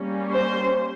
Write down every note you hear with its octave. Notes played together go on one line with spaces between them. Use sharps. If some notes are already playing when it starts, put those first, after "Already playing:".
Already playing: G3 A#3 C#4
C5